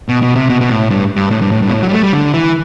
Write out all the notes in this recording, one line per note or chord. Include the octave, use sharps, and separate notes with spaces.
B2
B2
C3
B2
B2
A2
G2
G2
A2
G2
A2
G2
B2
A2
F#3
G3
A3
G3
D3
E3